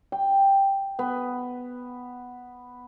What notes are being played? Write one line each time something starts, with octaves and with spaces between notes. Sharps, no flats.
G5
B3